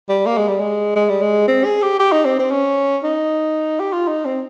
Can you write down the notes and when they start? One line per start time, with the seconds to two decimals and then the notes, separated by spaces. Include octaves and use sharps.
0.09 G3
0.26 A#3
0.37 G#3
0.48 G3
0.60 G#3
0.95 G#3
1.09 G3
1.22 G#3
1.48 C4
1.65 G#4
1.82 G4
2.00 G4
2.12 D#4
2.25 C4
2.39 C4
2.51 C#4
3.03 D#4
3.80 G4
3.93 F4
4.07 D#4
4.25 C4